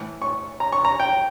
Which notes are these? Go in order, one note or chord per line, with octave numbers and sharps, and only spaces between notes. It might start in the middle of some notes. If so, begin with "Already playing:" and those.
Already playing: A2 E3
C#6
A#5
C#6
A#5
G5